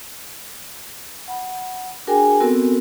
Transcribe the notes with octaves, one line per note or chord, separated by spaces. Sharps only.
F#5 B5
D4 F#4 G#4 A#4 G5 G#5
B3 C4 F#4 A4 A#4 E6